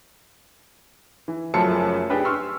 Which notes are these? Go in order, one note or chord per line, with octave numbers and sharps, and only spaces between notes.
E3
F#1 F#2 F3 A3 A5 C#7
D4 G4 G#4 B4
C6 C#6 E6 F6